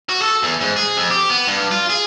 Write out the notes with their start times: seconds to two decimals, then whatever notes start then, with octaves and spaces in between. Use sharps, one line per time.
0.09 F#4
0.22 A4
0.43 E2
0.61 G#2
0.76 G#4
0.97 F2
1.10 G4
1.29 B3
1.47 G2
1.71 F4
1.90 G#4